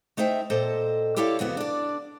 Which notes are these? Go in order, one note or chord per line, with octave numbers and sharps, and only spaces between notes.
A3 D#4 C5 E5 G5
A#2 A4 C5 D#5 G5
E4 G4 A4 C#5 D5 F5
F2 C#3 B3 F#4
D4 D5